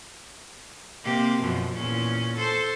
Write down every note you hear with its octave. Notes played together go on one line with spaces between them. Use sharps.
C3 A#3 G4
F#2 B2 F3
E2 A#2 C#4
A4 C5